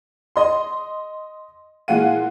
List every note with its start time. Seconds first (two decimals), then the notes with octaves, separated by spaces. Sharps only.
0.36 D#5 C6
1.88 A#2 E3 G#3 F5 F#5 D#7